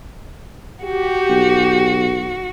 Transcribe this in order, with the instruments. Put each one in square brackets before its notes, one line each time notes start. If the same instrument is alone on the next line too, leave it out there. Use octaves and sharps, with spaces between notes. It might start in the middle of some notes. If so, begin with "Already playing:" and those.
[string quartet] F#4 [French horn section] G4
[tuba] B1